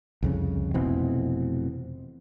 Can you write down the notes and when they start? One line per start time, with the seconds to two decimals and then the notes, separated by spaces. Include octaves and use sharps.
0.23 C2 F2 C#3
0.74 F1 B2 E3 C4